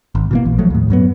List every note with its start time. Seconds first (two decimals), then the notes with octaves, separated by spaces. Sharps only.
0.15 G#1
0.31 B2 E3 A#3
0.45 A#1
0.58 F3 F#3 A3
0.70 D#2 A2
0.90 G2 F#3 B3